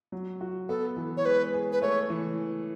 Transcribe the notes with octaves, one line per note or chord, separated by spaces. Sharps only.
F#3
F#4
B3 A4
E3
C#5
G#3 B4
G#4
B4
A3 C#5
E3